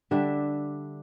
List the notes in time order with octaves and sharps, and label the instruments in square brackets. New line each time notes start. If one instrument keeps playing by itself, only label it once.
[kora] D3 G3 D4 E5